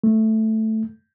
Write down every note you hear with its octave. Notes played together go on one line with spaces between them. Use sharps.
A3